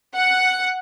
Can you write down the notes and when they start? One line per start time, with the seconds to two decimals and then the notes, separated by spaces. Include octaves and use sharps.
0.16 F#5